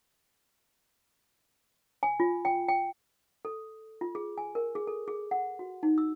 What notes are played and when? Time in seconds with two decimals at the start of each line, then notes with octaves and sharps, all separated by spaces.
2.03 G#5
2.20 F4
2.45 G5
2.68 G5
3.45 A4
4.01 F4
4.15 G#4
4.38 G#5
4.55 A#4
4.75 G#4
4.87 A4
5.08 G#4
5.31 F#5
5.59 F#4
5.83 D#4
5.98 E6